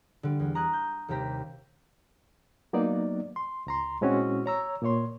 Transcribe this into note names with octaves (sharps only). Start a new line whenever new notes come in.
D3 G3
E2
A#5 D#6 F#6 G#6
G6
D#2 C3 G3 G4 A#5 B6
F#3 A#3 B3 D#4 D5
C6
C#2 A#5 C6
A#2 G#3 C4 C#4 E4 F#4
C#5 A#5 E6
A#2 A#3 C#5 C6